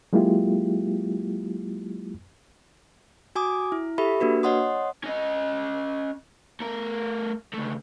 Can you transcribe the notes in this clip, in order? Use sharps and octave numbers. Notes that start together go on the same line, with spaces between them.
F#3 G#3 A#3 E4 F4 G4
F#4 G#5 D6 D#6
E4
G4 A4 E5 B5
A#3 D4 F#4 B4
C#5 D#5 F#5 C6 D#6
C#4 D#5
A3 A#4
C#2 A3